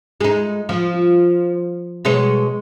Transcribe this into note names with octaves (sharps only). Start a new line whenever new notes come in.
G#3 D#4
F3
B2 G#3 C#5